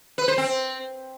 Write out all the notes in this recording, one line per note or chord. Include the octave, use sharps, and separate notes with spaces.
B4
C5
C4